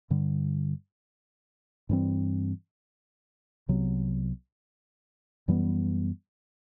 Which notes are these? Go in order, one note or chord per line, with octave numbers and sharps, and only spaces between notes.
G2 D3 G3
G2 E3 G3 C4
C2 C3 F#3 B3
F#2 E3 G3 B3